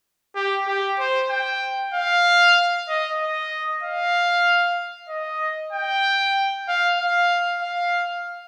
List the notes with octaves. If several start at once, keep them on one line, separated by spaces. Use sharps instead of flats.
G4
G4
C5
G5
F5
D#5
D#5
F5
D#5
G5
F5
F5
F5